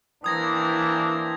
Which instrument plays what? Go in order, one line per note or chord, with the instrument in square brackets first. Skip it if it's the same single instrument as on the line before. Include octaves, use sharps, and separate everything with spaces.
[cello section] E3 [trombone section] A#3 C4 D4 [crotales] D#6 G#6 A#6